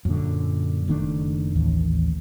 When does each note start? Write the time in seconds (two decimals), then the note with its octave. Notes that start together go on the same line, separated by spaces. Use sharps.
0.05 F#2 A#2 D3
0.88 F#1 D#3 A3 D4
1.55 A1 D#2